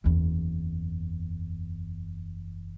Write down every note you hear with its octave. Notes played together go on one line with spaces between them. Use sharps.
F#1 E2